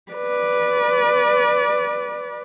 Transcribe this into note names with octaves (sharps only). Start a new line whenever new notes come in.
B4 D5